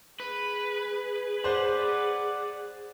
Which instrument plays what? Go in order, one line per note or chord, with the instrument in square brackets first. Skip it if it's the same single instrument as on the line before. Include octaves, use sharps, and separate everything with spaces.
[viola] G#4 [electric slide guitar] B4
[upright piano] C5 [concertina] D5 F#5